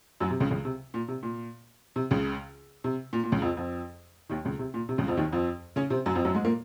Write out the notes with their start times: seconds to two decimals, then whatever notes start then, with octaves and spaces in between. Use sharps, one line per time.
0.20 F#2 F#3
0.30 C3
0.40 C#2 C#3
0.51 C#2 C#3
0.65 C3
0.94 A#2
1.08 C3
1.23 A#2
1.96 C3
2.11 C#2 C#3
2.84 C3
3.13 A#2
3.24 A#2
3.32 C#2 C#3
3.42 F2 F3
3.57 F2 F3
4.29 D#2 D#3
4.45 C#2 C#3
4.59 C3
4.74 A#2
4.89 C3
4.98 C#2 C#3
5.08 F2 F3
5.17 D#2 D#3
5.33 F2 F3
5.76 C#3 C#4
5.90 C3 C4
6.06 F#2 F#3
6.15 F2 F3
6.25 F#2 F#3
6.35 G#2 G#3
6.45 A#2 A#3